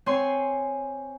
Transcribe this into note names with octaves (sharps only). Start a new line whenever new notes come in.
C4 C#5 G#5 C6